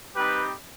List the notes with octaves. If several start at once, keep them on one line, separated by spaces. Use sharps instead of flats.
G3 C4 D#4 G4 B4